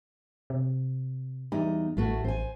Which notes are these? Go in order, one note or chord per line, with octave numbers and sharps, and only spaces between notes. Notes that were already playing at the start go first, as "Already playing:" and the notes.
C3
E2 G3 D#4
A1 A2 A3 F#4
A1 C5 G#5